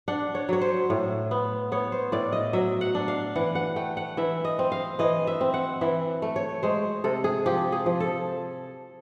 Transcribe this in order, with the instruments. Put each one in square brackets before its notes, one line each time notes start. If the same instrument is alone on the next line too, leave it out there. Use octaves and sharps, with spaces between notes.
[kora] D4 F#5
C#5
F#3 C#5
C5
A2
B3
B3 C#5
C5
A2 D5
D#5
F#3 E5
F#5
D4
F5
E3 F#5
F#5
A3 G5
F#5
E3 E5
D#5
C4
F5
E3 D#5
E5
C4
F#5
E3 E5
A3
C#5
G#3 C5
C3 A4
G#4
F3 G4
G#4
F3
A4